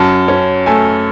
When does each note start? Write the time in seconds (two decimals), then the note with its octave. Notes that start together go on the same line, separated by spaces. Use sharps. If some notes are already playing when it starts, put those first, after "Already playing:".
Already playing: F#2 A5
0.28 C#4
0.66 A3 G#5